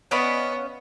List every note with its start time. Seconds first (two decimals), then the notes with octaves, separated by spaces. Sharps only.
0.11 B3 C#4 D5 D#5 F5 F#5 B5